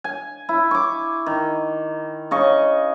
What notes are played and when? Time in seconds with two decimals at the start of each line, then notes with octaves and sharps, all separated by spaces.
0.04 G#5
0.49 E4
0.71 C#6 D6
1.26 D#3
2.31 C#3 D#5 C#6